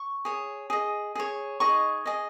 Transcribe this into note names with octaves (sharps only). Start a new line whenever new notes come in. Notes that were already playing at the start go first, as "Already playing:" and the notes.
Already playing: C#6
G#4 C#5
G#4 D#5
G#4 C#5
D#4 G#4 D#5 C#6
G#4 D#5